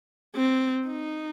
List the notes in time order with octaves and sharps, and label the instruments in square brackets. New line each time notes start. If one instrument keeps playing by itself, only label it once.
[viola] C4
D#4